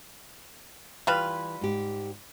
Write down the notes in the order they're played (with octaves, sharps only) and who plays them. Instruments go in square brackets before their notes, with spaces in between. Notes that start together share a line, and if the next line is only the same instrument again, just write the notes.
[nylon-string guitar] E3 [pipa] G3 F4 B4
[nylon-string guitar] G#2 G4